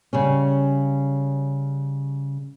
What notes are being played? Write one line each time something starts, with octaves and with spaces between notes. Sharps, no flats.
C#3 G3 C#4